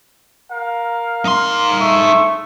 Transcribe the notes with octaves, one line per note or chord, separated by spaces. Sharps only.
A#4 F5
D#4 C6
A3 E5 C#6